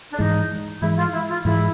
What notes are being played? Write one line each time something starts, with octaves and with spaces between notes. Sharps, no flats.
D4
G#2 E3 G#3 D#4
G#2 E3 G#3 E4
F4
E4
F4
G#2 E3 G#3 E4